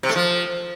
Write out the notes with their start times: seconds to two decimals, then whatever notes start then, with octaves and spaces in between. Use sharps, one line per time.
0.03 C3
0.09 A3
0.15 F3